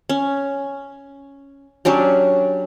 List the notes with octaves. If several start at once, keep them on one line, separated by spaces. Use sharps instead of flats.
C#4
F#3 C#4 D4 G4